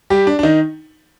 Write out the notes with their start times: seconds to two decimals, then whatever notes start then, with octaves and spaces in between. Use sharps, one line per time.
0.10 G3 G4
0.27 D4
0.39 D4
0.43 D#3 D#4